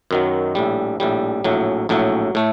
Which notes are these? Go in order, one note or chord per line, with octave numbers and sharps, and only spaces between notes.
F#2 D#3 F#3
A#1 A2 G3
A#1 A2 G3
A#1 A2 F#3
A#1 A2 F#3
A2 A3